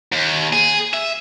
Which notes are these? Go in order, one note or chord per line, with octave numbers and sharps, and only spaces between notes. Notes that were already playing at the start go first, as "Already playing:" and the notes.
D#2
G#4
E5